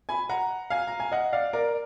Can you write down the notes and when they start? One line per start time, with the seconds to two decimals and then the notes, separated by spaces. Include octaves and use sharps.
0.09 G#5 B5
0.29 F#5 A#5
0.70 F5 G#5
0.87 A#5
1.00 G#5
1.12 D#5 F#5
1.33 D5 F5
1.53 A#4 D5